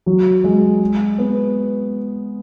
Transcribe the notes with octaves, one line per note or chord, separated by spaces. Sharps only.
F#3
G#3
B3